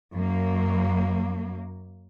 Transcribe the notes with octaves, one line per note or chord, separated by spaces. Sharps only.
F#2 F#3 A#3